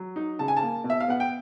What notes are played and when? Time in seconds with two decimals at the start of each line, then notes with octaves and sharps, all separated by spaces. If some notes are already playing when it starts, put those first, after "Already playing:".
Already playing: F#3
0.16 D#4
0.39 C#3 A5
0.48 G#5
0.57 A5
0.62 A#3
0.84 B2
0.90 E5
1.00 F5
1.08 B3 F#5
1.20 G5